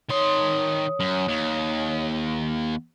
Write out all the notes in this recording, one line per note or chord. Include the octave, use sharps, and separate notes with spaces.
D#3 C#5 C6 D#6
F#2
D#2